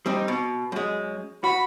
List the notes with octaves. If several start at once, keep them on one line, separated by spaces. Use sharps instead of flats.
G3 C4 D#4
B2
F#2 G#3
F#4 B5